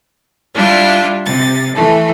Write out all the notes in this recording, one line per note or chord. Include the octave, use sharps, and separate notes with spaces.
G3 D4 E4 F4
C3 A6
E3 A3